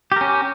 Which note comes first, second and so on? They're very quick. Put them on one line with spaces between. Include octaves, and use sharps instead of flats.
G4 A#4 C#4